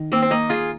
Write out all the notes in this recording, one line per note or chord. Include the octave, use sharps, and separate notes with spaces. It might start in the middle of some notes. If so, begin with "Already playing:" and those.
Already playing: D#3
A#3 C4
C4
A#3 D#4
F4 G#4